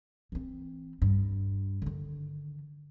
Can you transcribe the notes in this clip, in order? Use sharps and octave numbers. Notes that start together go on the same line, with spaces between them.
E3 C4
G2
D3 D#3